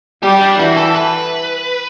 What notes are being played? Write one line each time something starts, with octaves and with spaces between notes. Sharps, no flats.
G3 G4
D4
E3 F#4
A4
B4